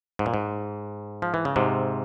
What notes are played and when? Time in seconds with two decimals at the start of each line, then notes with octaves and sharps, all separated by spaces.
0.19 G#2
0.26 A#2
0.34 G#2
1.22 F3
1.34 E3
1.45 C#3
1.56 G#2 C3